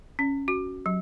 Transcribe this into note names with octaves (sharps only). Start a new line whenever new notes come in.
C#4
F#4
F#3